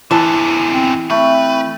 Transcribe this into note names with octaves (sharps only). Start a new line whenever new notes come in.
E2 D3 E3 G#4 A5
C4
A3 C4 B4